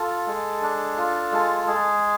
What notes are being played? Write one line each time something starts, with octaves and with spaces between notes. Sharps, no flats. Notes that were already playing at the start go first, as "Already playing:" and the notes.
Already playing: F4 A4
G#3
D4
F4
G#3
G#3 G#4